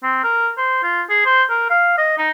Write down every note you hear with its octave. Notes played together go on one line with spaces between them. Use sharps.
C4
A#4
C5
F4
G#4
C5
A#4
F5
D#5
D#4